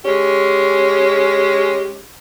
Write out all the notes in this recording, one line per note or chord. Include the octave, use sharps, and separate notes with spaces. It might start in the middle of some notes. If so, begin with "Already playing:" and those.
G#3 C#4 G4